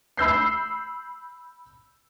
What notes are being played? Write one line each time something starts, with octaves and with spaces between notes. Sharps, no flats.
B5 E6 G6 C7